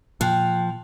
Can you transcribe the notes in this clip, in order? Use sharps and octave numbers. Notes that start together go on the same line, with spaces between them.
A#2 F3 G5 F#6